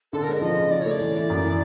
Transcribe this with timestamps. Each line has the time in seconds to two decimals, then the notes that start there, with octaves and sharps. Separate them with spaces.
0.13 D3 A4
0.23 A#4
0.28 G#3 D#5
0.42 F3 D#5
0.56 C#3
0.71 F3 D5
0.81 A3 C#5
0.91 D5
1.00 E3
1.15 E3
1.30 F#2
1.44 E3